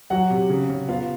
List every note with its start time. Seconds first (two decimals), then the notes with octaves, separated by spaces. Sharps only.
0.10 F#3 F#4 F#5
0.30 C3
0.50 C#3
0.70 C#3
0.88 B3 F4 F5